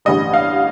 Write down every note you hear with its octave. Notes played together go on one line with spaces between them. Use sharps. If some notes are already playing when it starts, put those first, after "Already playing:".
A1 G2 D3 G3 D#5
F5